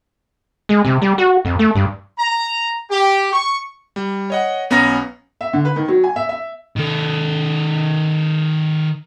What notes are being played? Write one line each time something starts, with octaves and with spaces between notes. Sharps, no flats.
G#3
C3
G3
F#4
F2
A3
G2
A#5
G4
C#6
G3
C#5 D#5 F#5
B1 B3 C#4 A#5 A#6
E5
D3
B4
D#3
F#3
G#5
E5
E5
D#3 A4